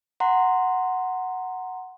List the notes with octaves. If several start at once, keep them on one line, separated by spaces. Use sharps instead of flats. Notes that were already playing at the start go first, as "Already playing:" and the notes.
F#5 A#5 C6